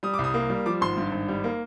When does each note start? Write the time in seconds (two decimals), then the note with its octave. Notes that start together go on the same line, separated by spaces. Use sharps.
0.03 G3 D#6
0.14 D6
0.18 C2
0.24 D#6
0.34 A#3
0.50 G3
0.66 F3 D6
0.81 G#1 C6
0.97 G2
1.12 G#1
1.28 G3
1.44 A#3